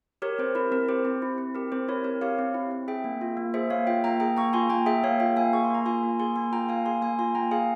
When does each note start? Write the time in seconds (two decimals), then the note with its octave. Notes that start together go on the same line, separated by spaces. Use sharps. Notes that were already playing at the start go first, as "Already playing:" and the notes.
0.22 G4 A#4 C#5
0.39 C4 C5
0.55 E4 A#4
0.72 C4 A#4
0.89 G4 C5
1.05 C4
1.22 E4
1.38 C4
1.55 G4 A#4
1.72 C4 C5
1.88 E4 A#4 C#5
2.04 C4 A#4 C#5
2.21 G4 C#5 F5
2.39 C4
2.54 E4
2.71 C4
2.88 G#4 E5 G5
3.04 A#3
3.21 F4
3.37 A#3
3.54 G#4 C5 E5
3.70 A#3 C#5 F5
3.87 F4 E5 G5
4.04 A#3 G5 A#5
4.20 G#4 G5 A#5
4.37 A#3 A#5 C#6
4.53 F4 G#5 C6
4.70 A#3 G5 A#5
4.86 G#4 E5 G5
5.03 A#3 C#5 F5
5.20 F4 E5 G5
5.36 A#3 F5 G#5
5.53 G#4 C#6
5.64 C6
5.70 A#3 A#5
5.86 F4 G#5 C6
6.03 A#3
6.20 G#4 G#5 C6
6.36 A#3 G#5 C6
6.52 F4 G5 A#5
6.69 A#3 F5 G#5
6.85 G#4 G#5 C6
7.02 A#3 G#5 C6
7.19 F4 G#5 C6
7.35 A#3 G5 A#5
7.51 G#4 F5 G#5